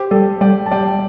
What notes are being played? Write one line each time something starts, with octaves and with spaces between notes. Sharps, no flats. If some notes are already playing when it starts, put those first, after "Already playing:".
Already playing: G4 C5
G3 A4 D5
G3 D5 G5
A5
G3 D5 G5